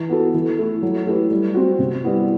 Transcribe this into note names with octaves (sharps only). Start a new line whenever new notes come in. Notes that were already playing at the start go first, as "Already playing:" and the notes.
Already playing: E3
B3 F#4 A4
E3
A3 E4
F#3
A3 E4 G4 B4
G3
C4 F#4
C3
G3 B3 E4